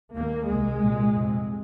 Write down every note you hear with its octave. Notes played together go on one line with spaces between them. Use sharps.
D#2 A#3
C2 C3 G#3
C2 A#2
F2 C3